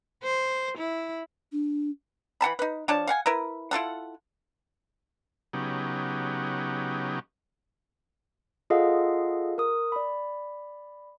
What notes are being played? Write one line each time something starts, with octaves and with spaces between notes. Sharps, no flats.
C5
E4
D4
E3 F#5 A5 B5
D#4 B4
F3 D4 C#5 A5
F5 F#5 G#5
E4 A#4 B4
E4 F4 A4 F#5
C#3 F#3 B3 D#4 G4
F4 G#4 A4 D#5 F5 F#5
A#4 D#6
D5 B5